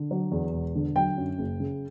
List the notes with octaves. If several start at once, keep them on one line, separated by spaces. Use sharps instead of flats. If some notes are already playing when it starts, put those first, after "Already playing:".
Already playing: D3
F#3
E2
E1
D3
F#3 G5
F#2
F#1
C#3